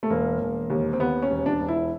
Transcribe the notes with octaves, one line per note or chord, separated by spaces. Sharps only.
A3
E1 A#3
E1
D#2
C4
D#2 B3
C#4
E1
D4
E1
E4